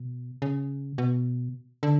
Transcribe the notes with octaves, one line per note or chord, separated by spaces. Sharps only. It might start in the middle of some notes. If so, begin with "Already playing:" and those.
Already playing: B2
C#3
B2
D3